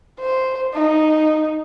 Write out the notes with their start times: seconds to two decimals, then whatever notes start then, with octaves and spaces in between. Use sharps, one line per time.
0.19 C5
0.74 D#4